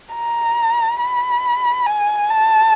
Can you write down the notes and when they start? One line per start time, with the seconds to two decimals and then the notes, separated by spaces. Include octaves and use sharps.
0.14 A#5
1.00 B5
1.86 G#5
2.29 A5